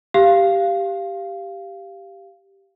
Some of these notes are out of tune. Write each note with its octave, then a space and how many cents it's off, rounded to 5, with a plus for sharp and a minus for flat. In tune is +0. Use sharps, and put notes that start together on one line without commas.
G4 +0 F5 -10